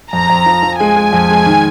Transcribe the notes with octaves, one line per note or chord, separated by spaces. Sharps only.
F2 A#5
F2
F3
F3
G#3 G#5
G#3
F2
G#3
D#3